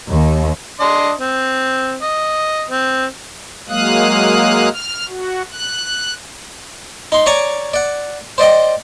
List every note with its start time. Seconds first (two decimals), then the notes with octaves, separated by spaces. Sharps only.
0.11 D#2
0.80 D4 D#5 C6
1.20 C4
2.01 D#5
2.70 C4
3.69 F#3 G#3 A#3 F5 D#6 F#6
4.72 F6
5.08 F#4
5.52 F#6
7.12 D#4 C6
7.26 C#5 D5 G#5 A#5 C#6 D6
7.74 D5 F#5
8.38 C5 D5 D#5 G5